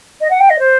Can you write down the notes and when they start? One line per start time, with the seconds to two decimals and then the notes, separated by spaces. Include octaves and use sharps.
0.20 D#5
0.30 F#5
0.40 G5
0.49 D#5
0.59 C5